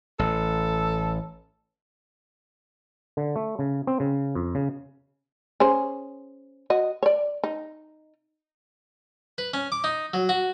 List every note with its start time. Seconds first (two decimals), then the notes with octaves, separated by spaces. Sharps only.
0.19 A1 A4
3.17 D3
3.36 A3
3.59 C#3
3.87 C4
4.00 C#3
4.35 F2
4.55 C#3
5.60 C#4 G#4 C5
6.70 F#4 D#5
7.03 C#5 D5
7.44 D#4
9.38 B4
9.54 C#4
9.72 D6
9.84 D#4
10.14 F#3
10.29 F#4